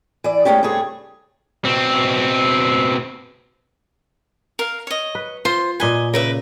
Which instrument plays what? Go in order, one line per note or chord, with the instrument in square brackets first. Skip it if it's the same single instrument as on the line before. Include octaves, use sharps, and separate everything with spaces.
[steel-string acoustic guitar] E3 D5
G#3 A3 B3 C#4 D4 G4
G2 C3 A3 G#4 C#5
[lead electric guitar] B2 C4
[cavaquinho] A#4 F5
C#5 D#5
[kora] B4
[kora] F4 [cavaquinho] C5 C6
[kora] A#2 B4 [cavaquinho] D#5 G#5
[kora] C#3 [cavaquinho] A#4 B4 E5